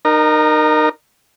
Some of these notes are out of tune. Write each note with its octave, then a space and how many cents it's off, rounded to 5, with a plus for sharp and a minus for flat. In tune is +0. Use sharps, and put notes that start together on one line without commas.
D#4 -30 A#4 +0